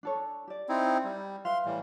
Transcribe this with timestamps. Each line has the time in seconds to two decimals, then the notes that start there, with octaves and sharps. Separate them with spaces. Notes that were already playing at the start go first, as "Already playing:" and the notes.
0.03 D4 A4 C#5
0.48 G4 D5
0.69 C4 D#4 E4
1.04 G3
1.45 B4 E5 F5 C6
1.65 A2 E3 G3